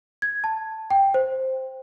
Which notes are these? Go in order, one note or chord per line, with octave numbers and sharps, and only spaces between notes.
G#6
A5
G5
C5